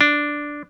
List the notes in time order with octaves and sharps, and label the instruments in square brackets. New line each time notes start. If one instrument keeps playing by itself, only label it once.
[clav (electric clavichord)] D4